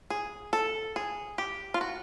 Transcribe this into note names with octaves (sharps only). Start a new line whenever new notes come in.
G#4
A4
G#4
G4
F4
F#4